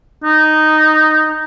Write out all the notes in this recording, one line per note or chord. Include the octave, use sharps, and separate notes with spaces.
D#4